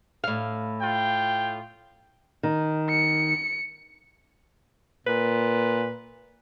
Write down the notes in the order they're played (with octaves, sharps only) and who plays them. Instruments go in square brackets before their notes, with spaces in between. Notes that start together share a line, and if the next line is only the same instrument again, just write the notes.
[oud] A2 F5
[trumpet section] F4 G5
[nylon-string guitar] D#3
[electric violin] C#7
[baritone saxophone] A#2 [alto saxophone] B4